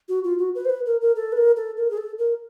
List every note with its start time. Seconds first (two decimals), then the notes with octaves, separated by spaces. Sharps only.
0.09 F#4
0.24 F4
0.39 F#4
0.55 B4
0.65 C5
0.70 B4
0.86 A#4
1.01 A#4
1.16 A4
1.32 B4
1.37 A#4
1.57 A4
1.77 A#4
1.91 G#4
1.98 A4
2.18 A#4